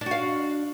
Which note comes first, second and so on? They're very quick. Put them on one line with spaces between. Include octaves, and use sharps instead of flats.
D4 F#4 F5